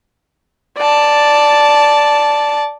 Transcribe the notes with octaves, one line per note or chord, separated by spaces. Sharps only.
D5 A5